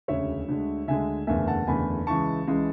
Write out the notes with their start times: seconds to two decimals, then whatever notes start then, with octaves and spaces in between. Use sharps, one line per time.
0.08 E1 D2 C#3 C#5 E5
0.48 D2 D3 G#3
0.88 D2 D3 G#3 E5 G#5
1.27 F#1 E2 D3 A3 E5 G#5
1.47 F#5 A5
1.67 F#1 E2 D3 A3 G#5 B5
2.07 C#2 C#3 E3 G#3 A5 C#6
2.47 C#2 C#3 E3 G#3